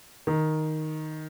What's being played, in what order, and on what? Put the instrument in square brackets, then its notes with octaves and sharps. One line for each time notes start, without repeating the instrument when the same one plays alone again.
[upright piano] D#3